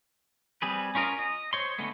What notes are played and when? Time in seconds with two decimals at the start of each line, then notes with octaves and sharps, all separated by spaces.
0.62 G3 C4 G#4 B4
0.95 C#4 F4 A#4 D#5
1.19 D#5
1.53 C5 C#5 C6
1.78 D3 G#3 A3 B3